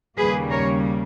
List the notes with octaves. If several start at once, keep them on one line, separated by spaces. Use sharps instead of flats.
D#2 C#3 G3 A#3 G#4 B4
A#4 C#5